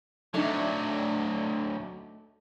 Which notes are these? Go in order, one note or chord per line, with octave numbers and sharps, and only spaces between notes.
D2 F#3 A3 D4 D#4